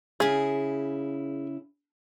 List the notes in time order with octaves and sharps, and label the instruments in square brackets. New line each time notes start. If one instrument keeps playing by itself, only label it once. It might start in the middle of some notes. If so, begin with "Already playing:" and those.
[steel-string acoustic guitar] C#3 E4 [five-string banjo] G#4